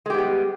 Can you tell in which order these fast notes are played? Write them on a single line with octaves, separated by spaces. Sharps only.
G#3 G4 B3 G3